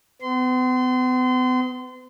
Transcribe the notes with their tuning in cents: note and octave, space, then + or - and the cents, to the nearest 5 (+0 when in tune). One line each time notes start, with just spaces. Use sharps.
B3 +40 C6 -25